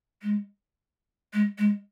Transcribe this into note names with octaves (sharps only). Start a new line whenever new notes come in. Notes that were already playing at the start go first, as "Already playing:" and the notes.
G#3
G#3
G#3